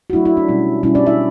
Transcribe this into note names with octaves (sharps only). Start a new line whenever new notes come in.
F#4
F#3 A3 D4 E4
E4
D4
B2 G3 C#4
B2 G3 C#4 E4
D4 D5
E4 E5